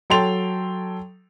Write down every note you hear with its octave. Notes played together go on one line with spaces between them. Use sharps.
F#3 A4 G5 C6 A6 F7